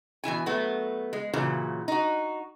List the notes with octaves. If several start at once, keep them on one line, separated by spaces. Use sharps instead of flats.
B2 E3 E4 G#5
F#3 A3 B3
G#3
A#2 C#3 E3 F#3
D#4 F#4